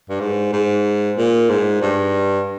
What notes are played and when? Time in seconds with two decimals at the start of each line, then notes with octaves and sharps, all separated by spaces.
0.09 G2
0.20 G#2
0.53 G#2
1.17 A#2
1.49 G#2
1.82 G2